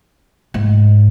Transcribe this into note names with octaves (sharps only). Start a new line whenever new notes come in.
G#2